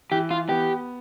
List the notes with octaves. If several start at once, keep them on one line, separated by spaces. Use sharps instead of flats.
E3 G4
F4
B3 G4